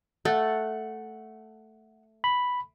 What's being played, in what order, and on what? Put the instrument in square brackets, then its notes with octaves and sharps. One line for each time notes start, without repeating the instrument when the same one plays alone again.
[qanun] A3 [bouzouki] F#5
[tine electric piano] B5